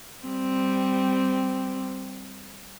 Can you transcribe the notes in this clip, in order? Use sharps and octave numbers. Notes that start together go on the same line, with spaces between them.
G3 C4